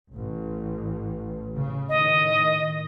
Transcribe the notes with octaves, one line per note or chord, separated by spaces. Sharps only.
A1
C#3
A2 D#3 D#5